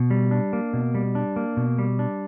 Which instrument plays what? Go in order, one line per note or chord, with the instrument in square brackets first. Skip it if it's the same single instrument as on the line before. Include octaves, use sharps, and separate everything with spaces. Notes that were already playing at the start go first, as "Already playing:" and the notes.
Already playing: [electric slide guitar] B2
G3
D4
A#3
B2
G3
D4
A#3
B2
G3
D4